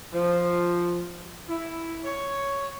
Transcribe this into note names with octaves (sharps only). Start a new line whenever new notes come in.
F3
E4
C#5